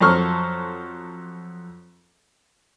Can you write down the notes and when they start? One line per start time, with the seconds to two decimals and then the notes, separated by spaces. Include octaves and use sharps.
0.01 F2 F#3 A4 C5 C#6 F6